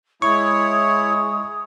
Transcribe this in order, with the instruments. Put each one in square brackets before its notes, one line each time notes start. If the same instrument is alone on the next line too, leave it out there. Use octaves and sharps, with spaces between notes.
[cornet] G#3 [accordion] E4 C#5 [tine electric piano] C#6 [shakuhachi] D#6